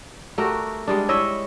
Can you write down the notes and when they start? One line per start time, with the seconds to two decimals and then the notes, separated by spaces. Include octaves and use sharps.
0.38 A3 F#4 G4 A#4
0.87 G3 G#3 D4
1.09 E4 C#5 D#5 E5